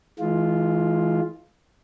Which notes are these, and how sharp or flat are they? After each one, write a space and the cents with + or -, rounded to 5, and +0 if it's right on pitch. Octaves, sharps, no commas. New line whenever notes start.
E3 -25 G#3 +25 F4 +0